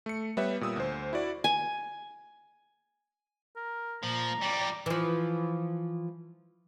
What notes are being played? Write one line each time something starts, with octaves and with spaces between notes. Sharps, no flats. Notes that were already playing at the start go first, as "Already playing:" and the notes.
A3 C#7
G3 B3 B4 C#5 E5
A#2 G3 D#6 E6
D2 C5
E4 F#4 D5
G#5
A#4
A#2 F3 A#5
F2 G3 D5
E3 F3